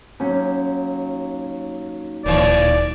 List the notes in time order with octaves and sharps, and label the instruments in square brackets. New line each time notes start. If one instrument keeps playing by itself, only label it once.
[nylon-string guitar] D#2 F#3 C#4
[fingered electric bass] D1 A#2 [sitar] D#3 E3 C#5 [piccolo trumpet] D5